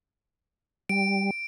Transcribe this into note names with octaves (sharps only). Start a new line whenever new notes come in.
G3 D7